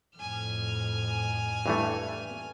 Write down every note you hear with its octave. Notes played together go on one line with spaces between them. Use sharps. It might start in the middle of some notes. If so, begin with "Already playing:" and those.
F2 A2 G#5 F6
G2 E3 A3